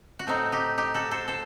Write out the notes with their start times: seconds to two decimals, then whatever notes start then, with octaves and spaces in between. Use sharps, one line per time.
0.19 F#4
0.27 A2 A3 C4 D#4
0.52 D#4 G4
0.78 D#4 G4
0.94 F#4 A4
1.11 A4 C5
1.28 A4 C5